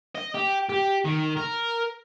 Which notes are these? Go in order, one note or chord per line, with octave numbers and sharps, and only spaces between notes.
D#5
G4
G4
D#3
A#4